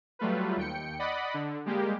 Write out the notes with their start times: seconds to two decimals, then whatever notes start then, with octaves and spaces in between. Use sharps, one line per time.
0.19 F#3 G3 A3 F4 B4
0.57 D#2 G5 C#7
0.99 D5 D#5 F#5 B5
1.34 D3
1.65 G3 G#3 A#3 G4